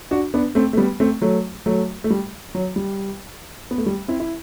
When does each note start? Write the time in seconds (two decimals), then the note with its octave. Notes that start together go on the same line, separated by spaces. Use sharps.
0.11 D4 F#4
0.34 B3 D4
0.55 A3 C4
0.73 A3
0.77 G3 B3
1.00 A3 C4
1.22 F#3 A3
1.66 F#3 A3
2.04 A3
2.10 G3
2.55 F#3
2.76 G3
3.71 B3
3.78 A3
3.86 G3
4.08 C4 E4
4.20 E4